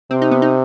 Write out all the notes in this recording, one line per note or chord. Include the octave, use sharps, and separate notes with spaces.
C3 C4
D#4
B3
D#4